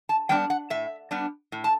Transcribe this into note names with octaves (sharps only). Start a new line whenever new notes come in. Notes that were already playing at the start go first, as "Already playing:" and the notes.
A5
G3 B3 D4 G5
F#5
A2 E5
G3 B3 D4
A2
A5